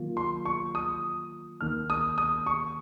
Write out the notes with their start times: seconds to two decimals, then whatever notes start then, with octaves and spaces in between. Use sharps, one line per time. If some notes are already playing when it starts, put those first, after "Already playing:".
Already playing: D#3 F#3 A#3 F4
0.17 C6
0.45 C#6
0.75 D#6
1.61 D#2 D#3 A#3 F6
1.90 D#6
2.18 D#6
2.46 C#6